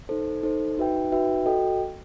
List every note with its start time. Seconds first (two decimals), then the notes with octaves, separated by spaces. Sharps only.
0.09 D#4 A4 C5
0.43 D#4 A4 C5
0.77 D#4 F#4 B4 E5 G5
1.11 D#4 F#4 B4 E5 G5
1.45 F#4 A4 D#5 G5